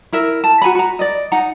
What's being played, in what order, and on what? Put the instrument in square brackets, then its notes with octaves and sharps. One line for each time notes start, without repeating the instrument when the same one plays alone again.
[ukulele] E4 A#4 E5
A5
F#4 G#5 A#5 B5
F#4 A#5
D5 D#5
D#4 D#5 F#5 A#5